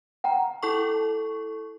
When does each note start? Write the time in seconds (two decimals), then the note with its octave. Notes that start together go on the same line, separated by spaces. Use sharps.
0.24 F#5 G5 A#5
0.63 E4 A4 C#6